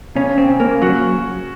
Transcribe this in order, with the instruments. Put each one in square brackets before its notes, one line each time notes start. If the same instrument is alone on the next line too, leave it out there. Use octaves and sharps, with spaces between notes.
[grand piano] C#3 [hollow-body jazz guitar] C#4
[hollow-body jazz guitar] C4
[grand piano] C#3
[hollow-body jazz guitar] A#3
[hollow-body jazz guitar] F#3 [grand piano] F#4